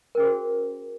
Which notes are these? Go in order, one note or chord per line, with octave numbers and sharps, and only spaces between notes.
C#4 F#4 G#4 A#4 C5